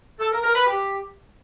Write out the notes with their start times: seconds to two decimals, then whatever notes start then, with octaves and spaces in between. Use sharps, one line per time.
0.20 A4
0.32 A#4
0.43 A#4
0.55 B4
0.67 G4